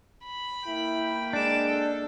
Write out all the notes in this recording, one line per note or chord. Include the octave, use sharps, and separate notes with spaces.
B5
A#3 E4 G5
G#3 D4 D6 E7
A4